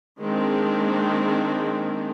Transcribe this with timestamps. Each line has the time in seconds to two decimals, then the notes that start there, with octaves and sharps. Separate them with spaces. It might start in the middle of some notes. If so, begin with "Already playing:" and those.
0.21 D#3 G#3 A#3 C4 D4